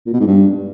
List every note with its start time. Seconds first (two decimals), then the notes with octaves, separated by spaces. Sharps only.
0.06 A#2
0.13 B2
0.20 G#2
0.27 G2